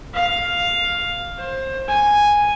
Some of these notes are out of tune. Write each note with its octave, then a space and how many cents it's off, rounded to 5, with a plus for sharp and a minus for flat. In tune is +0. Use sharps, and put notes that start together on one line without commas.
F5 +5
C5 +25
G#5 -5